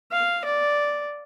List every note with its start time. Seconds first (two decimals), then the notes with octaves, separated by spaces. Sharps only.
0.12 F5
0.45 D5